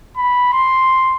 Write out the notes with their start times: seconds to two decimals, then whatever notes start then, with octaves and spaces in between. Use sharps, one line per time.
0.17 B5
0.53 C6